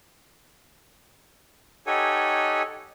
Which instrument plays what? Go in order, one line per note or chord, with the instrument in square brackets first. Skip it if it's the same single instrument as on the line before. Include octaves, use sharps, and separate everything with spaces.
[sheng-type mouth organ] D#4 G4 A4 C#5 F#5 G#5